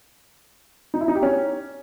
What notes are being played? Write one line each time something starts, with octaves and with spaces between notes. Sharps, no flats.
D#4
E4
D#4
G4
C#4